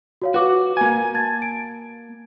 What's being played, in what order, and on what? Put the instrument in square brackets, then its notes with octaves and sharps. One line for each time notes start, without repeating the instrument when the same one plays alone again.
[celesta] F#4 C#5 F5
[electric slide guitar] F#4 [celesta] B4 D6
[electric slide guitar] A#3 G#5
[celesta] A5 G#6 A6
D7